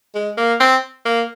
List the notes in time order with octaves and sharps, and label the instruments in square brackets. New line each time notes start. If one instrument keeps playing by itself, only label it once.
[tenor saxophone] G#3
A#3
C4
A#3